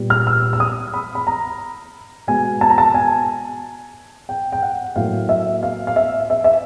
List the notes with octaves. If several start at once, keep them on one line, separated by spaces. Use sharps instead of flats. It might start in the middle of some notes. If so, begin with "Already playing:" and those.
Already playing: A#2 G3 B3
F6
E6
E6
D#6
B5
B5
A#5
B2 G#3 B3 G#5
A5
A#5
A5
G#5
G5
G5
F#5
A2 F#3 A#3 F5
E5
F5
F5
E5
E5
E5